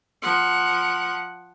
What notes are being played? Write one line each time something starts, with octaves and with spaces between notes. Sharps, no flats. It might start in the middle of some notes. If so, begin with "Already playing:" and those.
F3 F#5